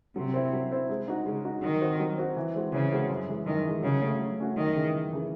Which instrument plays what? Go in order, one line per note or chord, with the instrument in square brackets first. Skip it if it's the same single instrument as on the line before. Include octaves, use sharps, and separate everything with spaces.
[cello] C3 [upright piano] F#3
[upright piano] C4 E4 C5
F#3
C4 E4 C5
G#3
D#4 F#4
[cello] C#3 [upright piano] G#3
[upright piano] D#4 F#4
[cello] D#3 [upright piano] F#3
[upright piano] C4 F#4 C5
F#3
C4 F#4 C5
E3
G#3 C4 F#4
[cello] C#3 [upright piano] E3
[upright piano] G#3 C4 F#4
F#2
E3 G#3
[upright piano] F#2 [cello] D#3
[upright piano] E3 G#3
[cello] C#3 [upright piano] F#3
[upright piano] A3 C#4 F#4
F#3
A3 C#4 F#4
[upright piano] F#2 [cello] D#3
[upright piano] C#3 E3
F#2
C#3 E3